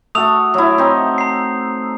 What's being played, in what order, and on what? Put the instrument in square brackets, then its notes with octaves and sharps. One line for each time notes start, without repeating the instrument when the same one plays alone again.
[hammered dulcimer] A3 F#4 A4 [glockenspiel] D#6 E6 F7
[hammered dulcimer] F#3 E4
C4 D#4
[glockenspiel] A#5 C7